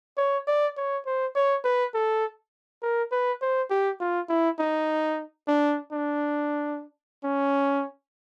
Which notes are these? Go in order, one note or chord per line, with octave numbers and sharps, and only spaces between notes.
C#5
D5
C#5
C5
C#5
B4
A4
A#4
B4
C5
G4
F4
E4
D#4
D4
D4
C#4